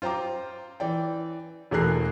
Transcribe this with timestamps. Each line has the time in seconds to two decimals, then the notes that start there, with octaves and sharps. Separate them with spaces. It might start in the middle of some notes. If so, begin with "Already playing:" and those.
0.02 F4 C5 G5 A#5 D6
0.80 E3 D5 G5
1.71 E1 E2 A3 A#4 F#6 C7